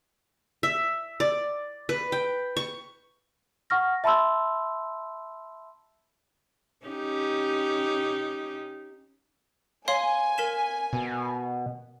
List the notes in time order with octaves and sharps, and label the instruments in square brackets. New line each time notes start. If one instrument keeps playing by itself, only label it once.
[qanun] E5
D5
B4
G5
C#6
[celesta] F#5 C#6 F6 A#6
E5 A5 B5 C6 E6
[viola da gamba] C#4 D#4 G4
[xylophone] C#5 F5 C6 [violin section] G#5
[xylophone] A#4 B6 E7
[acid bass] B2